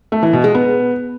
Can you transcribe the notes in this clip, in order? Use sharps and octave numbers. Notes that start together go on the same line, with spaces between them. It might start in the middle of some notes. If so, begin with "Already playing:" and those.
A3
E3
B2
G#3
B3